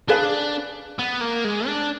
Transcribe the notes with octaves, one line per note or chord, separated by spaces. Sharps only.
D4 G#4 B4 F5
B3
A#3
G#3
D4